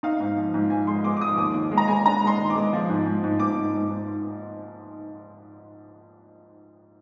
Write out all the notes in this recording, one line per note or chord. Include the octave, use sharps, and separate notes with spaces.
D#4 F5
G#2
F3
G#2
F3 G#5
G#3 C6
G#3 D6
D6
F3 D#6
D#2 D6
D#3 D6
G#3
A#5
G#3 G#5
D4 A#5
G#3 C6
D#3
D6
G#3
F3
G#2
G#2
G#2
G#2 D6
G#2
G#2
G#2